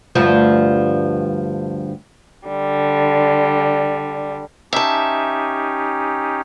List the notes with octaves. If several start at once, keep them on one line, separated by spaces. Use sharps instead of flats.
D2 G2 F3
D3 G3
C#4 D#4 G4 E5 A5